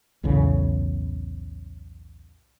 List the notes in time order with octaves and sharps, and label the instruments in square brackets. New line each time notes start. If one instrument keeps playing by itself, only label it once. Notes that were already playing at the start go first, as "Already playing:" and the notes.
[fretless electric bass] B1 E2 A2 C#3